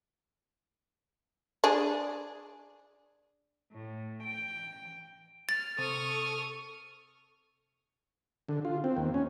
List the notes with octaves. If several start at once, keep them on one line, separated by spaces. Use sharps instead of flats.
D4 G#4
A2
G5
F6 A6
C3 A4 C#6 D#6 F6
D3
F4
C4
D#2
C#4